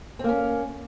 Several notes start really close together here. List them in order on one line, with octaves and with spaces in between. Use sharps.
C4 A#3 C#4